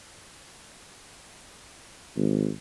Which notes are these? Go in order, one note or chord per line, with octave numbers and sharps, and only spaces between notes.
G#1